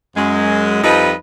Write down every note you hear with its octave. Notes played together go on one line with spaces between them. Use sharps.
F#2 G#3
F2 F3 G3 D#4 B4 D#5